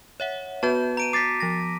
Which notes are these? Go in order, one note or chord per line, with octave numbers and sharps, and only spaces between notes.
C#5 E5 F#5
B3 F#4 B4 A5 G6
A#5 D7 D#7
D6 A6 B6 C7
F3 A#6